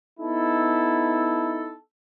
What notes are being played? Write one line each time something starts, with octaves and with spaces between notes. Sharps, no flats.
B3 D#4 E4 A4